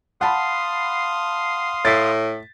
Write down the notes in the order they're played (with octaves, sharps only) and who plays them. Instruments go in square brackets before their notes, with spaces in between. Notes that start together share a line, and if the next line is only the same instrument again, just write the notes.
[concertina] F5 C6 D#6 [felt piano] F#5 A5 B5
[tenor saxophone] A2 [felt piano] A6 B6